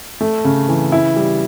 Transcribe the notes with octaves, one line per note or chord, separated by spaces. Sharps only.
A3
C#3
E3
E4
G3